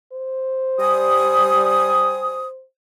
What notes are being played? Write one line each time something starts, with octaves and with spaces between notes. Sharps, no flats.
C5
G3 G#5 D#6